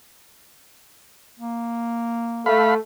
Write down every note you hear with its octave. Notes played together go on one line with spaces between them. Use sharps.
A#3
A3 A4 F5 B5